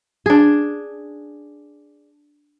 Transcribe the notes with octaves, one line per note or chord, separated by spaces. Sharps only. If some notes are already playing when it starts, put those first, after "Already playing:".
D4 G#4